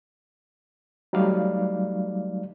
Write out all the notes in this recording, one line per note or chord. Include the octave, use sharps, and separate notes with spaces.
F#3 G3 A3 D#4 D5 F5